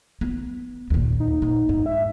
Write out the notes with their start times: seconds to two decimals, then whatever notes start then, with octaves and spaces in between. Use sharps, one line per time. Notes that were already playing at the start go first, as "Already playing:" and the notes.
0.21 B3
0.90 D#2 A#2
1.20 D#4
1.42 A#2
1.69 G#2
1.86 E5